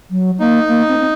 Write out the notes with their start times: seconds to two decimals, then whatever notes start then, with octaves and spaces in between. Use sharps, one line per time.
0.11 F#3
0.40 A#3 D#4
0.68 A#3
0.88 C4
0.99 C4